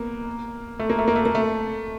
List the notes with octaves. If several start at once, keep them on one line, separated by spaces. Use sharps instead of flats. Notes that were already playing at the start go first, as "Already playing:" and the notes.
Already playing: A#3 B3
A3
A#3
A3
A#3
A3
A#3
A3